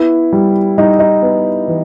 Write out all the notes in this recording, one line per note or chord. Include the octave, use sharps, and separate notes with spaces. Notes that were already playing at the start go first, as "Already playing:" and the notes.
Already playing: B3 E4
G3
G3 D#4
D#4
B3
E3